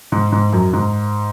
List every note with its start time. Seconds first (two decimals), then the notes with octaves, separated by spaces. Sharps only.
0.12 G#2
0.32 G#2
0.53 F#2
0.73 G#2